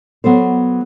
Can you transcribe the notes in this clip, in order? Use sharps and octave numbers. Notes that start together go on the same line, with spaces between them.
F#3 B3 A4 C5